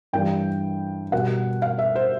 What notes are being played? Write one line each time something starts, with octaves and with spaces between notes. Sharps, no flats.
G2 E3 G3 G5
B2 G3 F#5
F5
E5
C5